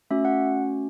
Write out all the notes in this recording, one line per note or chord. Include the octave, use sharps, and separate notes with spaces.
A3 C#4 F#4 E5
F#5